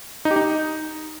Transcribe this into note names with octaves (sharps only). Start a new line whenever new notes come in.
D#4
G4
D#4